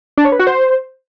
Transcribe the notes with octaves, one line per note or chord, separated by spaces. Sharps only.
D4
C#5
B4
F#4
C5